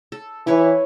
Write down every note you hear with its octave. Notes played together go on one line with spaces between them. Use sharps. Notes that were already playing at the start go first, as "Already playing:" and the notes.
A4
E3 E4 B4 C#5